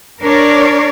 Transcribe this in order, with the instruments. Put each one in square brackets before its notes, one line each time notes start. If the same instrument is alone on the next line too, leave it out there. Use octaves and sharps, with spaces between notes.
[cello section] D4 A#4 C#5 D5